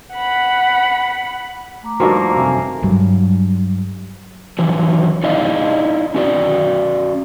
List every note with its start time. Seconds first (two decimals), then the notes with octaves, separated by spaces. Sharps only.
0.13 F#5 B5
1.83 A3 A#5 D6
2.00 G2 D#3 F3 A#3 F4 F#4
2.36 F#2 C3 A4 E5 G#5
2.82 G2 F#3
4.59 D#3 E3 F#3
5.24 D#4 E4 D5 D#5 F5
6.14 C#4 F#4 D5